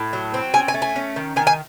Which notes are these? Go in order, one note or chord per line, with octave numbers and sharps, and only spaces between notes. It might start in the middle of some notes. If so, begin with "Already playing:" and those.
Already playing: A2
F#3
C4
C#4 G#5
G#5
A3
G#5
C#4
D#3
D#3 G#5
G#5